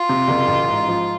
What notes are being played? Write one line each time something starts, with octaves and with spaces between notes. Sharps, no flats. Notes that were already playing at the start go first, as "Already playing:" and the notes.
Already playing: F4
C3
F#1
A1
G#2
F3